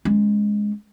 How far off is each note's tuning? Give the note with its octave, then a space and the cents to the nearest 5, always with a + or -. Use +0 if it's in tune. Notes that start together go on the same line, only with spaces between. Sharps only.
G#3 +0 C#4 +0